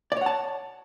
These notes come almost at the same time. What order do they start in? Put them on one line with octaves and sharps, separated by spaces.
D5 C#5 F#5 A5